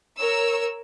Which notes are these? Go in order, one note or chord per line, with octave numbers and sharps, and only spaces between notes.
A#4 C#5 E6